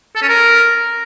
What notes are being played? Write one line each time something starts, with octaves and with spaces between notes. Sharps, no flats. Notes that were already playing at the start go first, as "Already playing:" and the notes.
A4
C#4
A#4